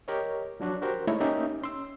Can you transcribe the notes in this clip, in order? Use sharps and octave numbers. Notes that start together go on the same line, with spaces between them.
G4 A#4 C#5 D#5
F3 F#3 D4 F#4
F#4 G4 A#4 C5
G#3 A3 D#4 E4 C#5
A#3 C#4 D#4 G4 E5
C#4 C6 E6